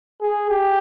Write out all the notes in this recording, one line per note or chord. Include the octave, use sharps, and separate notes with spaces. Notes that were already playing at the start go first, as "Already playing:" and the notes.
G#4
G4